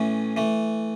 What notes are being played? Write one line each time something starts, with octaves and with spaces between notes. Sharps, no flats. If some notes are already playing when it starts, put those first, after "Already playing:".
Already playing: A2 E3 A3 C#4
E3 A3